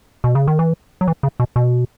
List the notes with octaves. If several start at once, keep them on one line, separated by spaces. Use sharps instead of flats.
B2
C#3
D#3
E3
F#3
E3
C#3
B2
B2